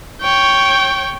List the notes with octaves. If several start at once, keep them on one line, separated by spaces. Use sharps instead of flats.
C#5 G5